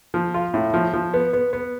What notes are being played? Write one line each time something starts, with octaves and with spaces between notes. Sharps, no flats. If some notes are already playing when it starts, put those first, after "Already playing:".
F3
F4
A2
F3
F3
B3
B3
B3